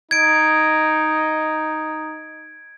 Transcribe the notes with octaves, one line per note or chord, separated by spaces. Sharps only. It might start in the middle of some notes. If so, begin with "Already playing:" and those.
D#4 G#6 D7